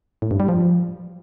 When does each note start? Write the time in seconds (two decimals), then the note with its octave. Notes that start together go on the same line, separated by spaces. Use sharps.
0.22 A2
0.31 G2
0.40 G3
0.48 F3